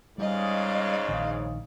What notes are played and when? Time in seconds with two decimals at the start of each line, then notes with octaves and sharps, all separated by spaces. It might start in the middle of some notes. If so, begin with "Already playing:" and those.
0.18 G#2 C#3 G3 D5 D#5 F5
1.09 A#1 D#3